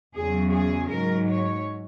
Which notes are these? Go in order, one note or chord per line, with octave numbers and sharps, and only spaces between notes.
E2 C#3 F#3 G#4
G#4
G#2 F#3 A#4
C#5